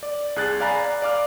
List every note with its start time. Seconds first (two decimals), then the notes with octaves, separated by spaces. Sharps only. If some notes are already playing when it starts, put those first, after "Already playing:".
0.03 D5
0.36 C2 G#4 F#6 A6
0.60 D5 F5 G#5 A#5 B5
0.80 D5
1.02 D5 F5 D6 F6